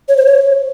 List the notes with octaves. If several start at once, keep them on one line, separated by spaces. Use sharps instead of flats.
C#5
C5
C#5